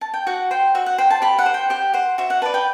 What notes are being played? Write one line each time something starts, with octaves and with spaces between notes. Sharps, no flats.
A5
G5
F#4 F#5
C5 G5
F#4 E5
F#5
C5 G5
A5
G4 B5
F#5
C5
G5
G4 G5
C5 F#5
F#4 E5
F#5
B4 D5 A5
G5